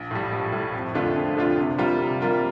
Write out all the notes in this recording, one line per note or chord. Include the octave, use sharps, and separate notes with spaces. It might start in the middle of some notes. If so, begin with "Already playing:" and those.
Already playing: A#1
A2 G3
A#1
A2 G3
F2
D3 A3 D4 F4
F2
D3 A3 D4 F4
C3
G3 A#3 F4 A#4
C3
G3 A#3 F4 A#4